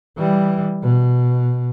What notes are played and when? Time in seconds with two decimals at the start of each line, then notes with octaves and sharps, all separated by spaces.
0.18 E3 G3
0.83 B2